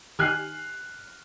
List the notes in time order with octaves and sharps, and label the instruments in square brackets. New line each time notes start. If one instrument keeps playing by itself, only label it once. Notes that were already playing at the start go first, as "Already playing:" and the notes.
[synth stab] D#3 G4 G#5 [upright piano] F6 F#6 C7